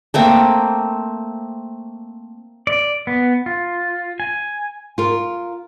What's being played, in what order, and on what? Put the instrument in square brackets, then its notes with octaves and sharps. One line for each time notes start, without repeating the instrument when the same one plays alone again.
[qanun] A3 A#3 C4
[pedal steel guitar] D5
B3
F4
G#5
[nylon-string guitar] F4 A#4